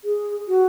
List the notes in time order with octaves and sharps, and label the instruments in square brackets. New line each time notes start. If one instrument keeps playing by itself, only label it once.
[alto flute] G#4
F#4